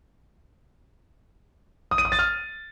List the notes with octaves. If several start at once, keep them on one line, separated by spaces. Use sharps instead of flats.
D#6
D#7
D#6
A6
F6